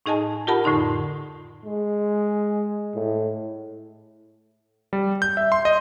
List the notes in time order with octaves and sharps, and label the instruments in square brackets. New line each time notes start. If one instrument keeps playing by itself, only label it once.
[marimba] A2 D#4 G#4 D#5 G#5 A5
F4 G4 A#4 F#5 A5 B5
F2 A2 D3 D#4 C6
[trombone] G#3
A2
[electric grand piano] G3
G6
E5
C6
D#5